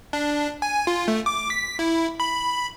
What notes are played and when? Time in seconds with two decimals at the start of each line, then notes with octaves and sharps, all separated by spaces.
0.13 D4
0.62 G#5
0.87 F4
1.08 A3
1.26 D6
1.50 B6
1.79 E4
2.20 B5